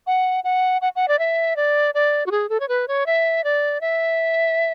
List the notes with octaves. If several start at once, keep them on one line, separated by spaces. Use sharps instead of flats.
F#5
F#5
F#5
F#5
D5
E5
D5
D5
F#4
G#4
A4
C#5
B4
C#5
E5
D5
E5